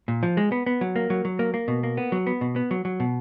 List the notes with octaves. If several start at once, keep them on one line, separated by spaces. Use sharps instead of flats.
A#2
F3
G#3
B3
B3
F#3
A#3
F#3
F#3
A#3
A#3
B2
A#3
B3
F#3
B3
B2
B3
F#3
F#3
B2